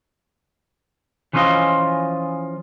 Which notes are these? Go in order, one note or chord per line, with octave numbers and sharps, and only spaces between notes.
E3 F3 C#4 D#4 F4 D#5